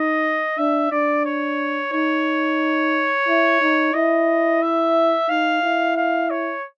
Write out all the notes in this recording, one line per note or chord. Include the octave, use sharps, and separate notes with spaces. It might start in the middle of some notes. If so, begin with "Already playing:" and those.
Already playing: D#4 D#5
D4 E5
D4 D5
C#5
D#4 C#5
E4
D#4
E4 D#5
E5
D#4 F5
E4
F5
C#5